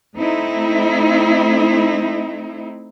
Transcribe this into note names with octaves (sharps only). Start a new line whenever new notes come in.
A3 C4 D#4 E4